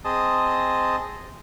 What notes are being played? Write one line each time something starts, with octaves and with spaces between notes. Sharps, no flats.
C4 G#4 D#5 A5 D#6